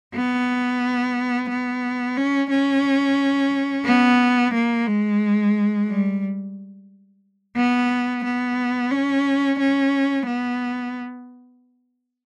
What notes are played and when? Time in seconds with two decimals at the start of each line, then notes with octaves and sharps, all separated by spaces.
0.15 B3
1.50 B3
2.17 C#4
2.50 C#4
3.85 B3
4.54 A#3
4.87 G#3
5.88 G3
7.57 B3
8.24 B3
8.92 C#4
9.59 C#4
10.27 B3